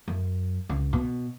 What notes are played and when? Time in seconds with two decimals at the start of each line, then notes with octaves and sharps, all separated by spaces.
0.08 F#2
0.69 C#2
0.93 B2